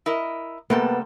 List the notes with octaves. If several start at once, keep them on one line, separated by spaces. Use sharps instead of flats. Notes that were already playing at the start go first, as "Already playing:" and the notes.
E4 A#4 D#5
C3 G3 A#3 B3 A4